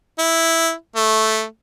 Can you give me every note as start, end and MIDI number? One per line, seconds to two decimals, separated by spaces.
0.19 0.73 64
0.96 1.44 57